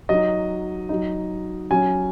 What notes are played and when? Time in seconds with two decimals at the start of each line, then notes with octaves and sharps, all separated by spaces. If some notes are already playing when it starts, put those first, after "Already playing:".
0.09 F#3 D#4 D#5
0.89 F#3 D#4
1.71 F#3 C#4 G#5